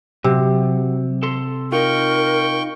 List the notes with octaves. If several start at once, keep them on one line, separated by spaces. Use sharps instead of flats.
C3 F#3
A4 C6
D#4 F4 A#4 G5 C#6